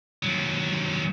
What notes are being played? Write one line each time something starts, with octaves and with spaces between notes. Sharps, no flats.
D#2 F#3